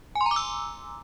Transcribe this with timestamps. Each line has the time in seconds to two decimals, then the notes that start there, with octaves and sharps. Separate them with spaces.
0.15 G#5
0.21 C6
0.26 A#5
0.31 D6
0.36 E6